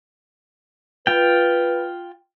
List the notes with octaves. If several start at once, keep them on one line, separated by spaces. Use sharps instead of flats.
F4 B4 G5